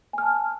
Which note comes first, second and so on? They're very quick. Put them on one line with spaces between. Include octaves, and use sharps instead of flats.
G#5 F6 A5